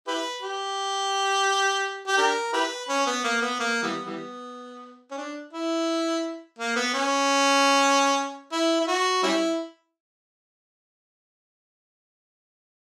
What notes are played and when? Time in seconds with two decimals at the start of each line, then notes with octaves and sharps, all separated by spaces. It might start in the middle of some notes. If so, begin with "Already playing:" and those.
0.07 E4 G4 B4
0.43 G4
2.07 G4
2.18 D4 G4 A#4
2.53 E4 G4 B4
2.89 C#4
3.06 B3
3.24 A#3
3.42 B3
3.60 A#3
3.83 E3 G3 B3
4.06 E3 G3 B3
5.11 C#4
5.18 D4
5.53 E4
6.59 A#3
6.76 B3
6.94 C#4
8.52 E4
8.81 E4
8.88 F#4
9.23 G3 C#4 E4